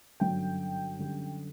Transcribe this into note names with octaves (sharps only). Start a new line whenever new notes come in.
G1 F#2 D3 F#3 G5
F#2 D3 G3